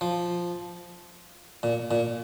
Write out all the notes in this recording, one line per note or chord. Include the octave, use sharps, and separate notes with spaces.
F3
A#2
A#2